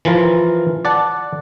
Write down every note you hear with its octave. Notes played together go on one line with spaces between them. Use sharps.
E3 F3 F4 A#4
D5 F#5 A5